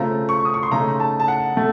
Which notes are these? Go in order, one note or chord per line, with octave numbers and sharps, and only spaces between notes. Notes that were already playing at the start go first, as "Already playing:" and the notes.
Already playing: C#3 A3 C4 F4 A#5
C#6
D#6
C#6
C6
C#3 A3 D#4 A#5
A5
A5
F#5
A3